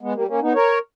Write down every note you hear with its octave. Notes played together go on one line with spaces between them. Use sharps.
G#3 B3
G3 A#3
A#3 C#4
B3 D#4
A#4 C#5